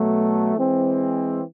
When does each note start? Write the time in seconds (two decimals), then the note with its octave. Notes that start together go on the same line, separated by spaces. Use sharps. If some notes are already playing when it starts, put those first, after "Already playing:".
Already playing: B2 F#3 A3
0.56 E3 G#3 C4